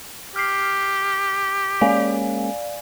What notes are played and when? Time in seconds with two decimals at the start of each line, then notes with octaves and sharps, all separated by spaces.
0.36 G4 F6 C7
1.81 G#3 A#3 C#4 D5 F5 G#5